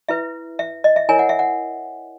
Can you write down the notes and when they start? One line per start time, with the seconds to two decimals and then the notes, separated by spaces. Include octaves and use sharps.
0.09 E4 B4 E5
0.59 E5
0.84 D#5
0.96 E5
1.09 E4 A#4 C#5 G#5
1.19 F#5
1.29 E5
1.39 F#5